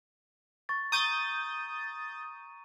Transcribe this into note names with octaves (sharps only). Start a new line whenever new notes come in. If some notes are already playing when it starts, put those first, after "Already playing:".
C#6 A6
A#5 C#6 D#6 G6 A6 D#7